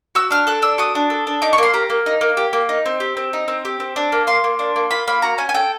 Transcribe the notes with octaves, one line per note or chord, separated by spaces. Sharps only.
F#4 E6
D4 F6
A4 F#6
D4 E6
F#4 D#6
D4
A4
D4
D#4 D6
C#6
A#3 C6
G4 A#5
A#3
D#4
A#3
G4
A#3
D#4
C4
G4
C4
D#4
C4
G4
C4
D4
A#3
F4 C6
A#3
D4
A#3
F4 B5
A#3 B5
F#4 A#5
C#4 G#5
G#5
A4 G5